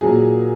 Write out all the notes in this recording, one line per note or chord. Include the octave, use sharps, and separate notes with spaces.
A#2 F#3 A#3 G#4